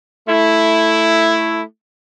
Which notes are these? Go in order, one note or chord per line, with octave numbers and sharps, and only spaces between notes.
A3 E4